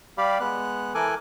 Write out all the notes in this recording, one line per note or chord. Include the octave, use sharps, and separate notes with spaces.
G3 G4 D5 F5 B5
G#3 B3 F#6
E3 A4 A#4 G#5 D6 F#6